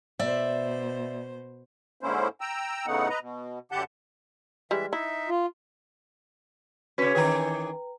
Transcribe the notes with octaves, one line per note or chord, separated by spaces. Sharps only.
B2 C5 D5 E5
G#2 D3 A#3 C#4 E4 C5
G5 A#5 E6
A2 C#3 A3 B3 D#4 F#5
B4 D#5 A#5
B2
F#2 D3 G4 F#5 A5 G6
E3 G3 G#3 E5
D#4 E4 E5
F4
C#3 C#4 F#4 B4 B6
D#3 E3 G#4 B4 G5 A#5